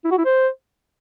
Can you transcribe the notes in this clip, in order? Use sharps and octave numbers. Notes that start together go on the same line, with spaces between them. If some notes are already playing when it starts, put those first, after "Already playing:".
E4
F#4
E4
C5